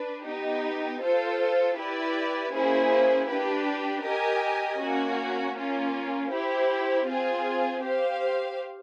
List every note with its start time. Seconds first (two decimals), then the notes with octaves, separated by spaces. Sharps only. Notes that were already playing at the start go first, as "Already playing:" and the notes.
Already playing: D4 B4
0.26 B3 D#4 G4
1.02 F4 A4 C5
1.78 E4 G4 B4 D5
2.53 A#3 C#4 E4 G#4 C5
3.29 D4 G4 B4
4.04 G4 A#4 D#5 G#5
4.79 A#3 C#4 F#4
5.55 A#3 C#4 F4
6.31 E4 G4 C5
7.07 C4 F4 G#4
7.83 G4 C5 F5